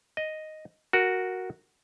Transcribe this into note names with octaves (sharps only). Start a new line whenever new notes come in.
D#5
F#4 A#4